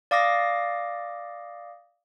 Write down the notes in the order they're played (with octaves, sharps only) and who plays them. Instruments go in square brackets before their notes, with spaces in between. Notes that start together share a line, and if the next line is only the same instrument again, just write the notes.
[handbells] D5 F5 D6 D#6 A#6